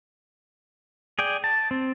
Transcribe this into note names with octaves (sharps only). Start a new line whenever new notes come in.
G#4 D5 G5
A5
C4